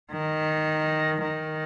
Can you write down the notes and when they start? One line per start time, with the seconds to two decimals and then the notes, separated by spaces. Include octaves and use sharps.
0.11 D#3
1.22 D#3